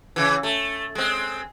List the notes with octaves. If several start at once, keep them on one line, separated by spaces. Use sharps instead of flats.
C#3 E3
A3
G#3 C4